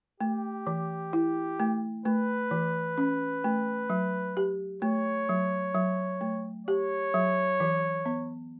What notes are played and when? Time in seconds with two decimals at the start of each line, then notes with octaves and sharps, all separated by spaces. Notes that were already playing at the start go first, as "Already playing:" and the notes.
0.20 A3 G4
0.67 E3
1.13 E4
1.60 A3
2.05 A3 B4
2.51 E3
2.98 C#4
3.44 A3
3.90 F#3
4.37 G4
4.82 A3 C#5
5.29 F#3
5.75 F#3
6.21 A3
6.67 G4 C#5
7.14 F#3
7.60 E3
8.06 B3